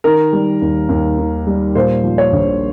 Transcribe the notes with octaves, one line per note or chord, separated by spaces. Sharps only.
D#3 A#4
G3
D#2
D#2
D#3
G3
A#2 C5
F3
C#5
A#1